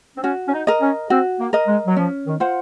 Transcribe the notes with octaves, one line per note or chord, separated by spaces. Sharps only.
C4
C#4 F#4
C#4
D#4
A#4 D#5
C#4
C4 F#4
A#3
A#4 D#5
G#3
F#3
F3 C#4
D#3
F4 C5 F#5